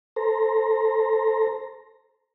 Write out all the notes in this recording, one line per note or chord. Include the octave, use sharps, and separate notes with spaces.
A4 C5 A#5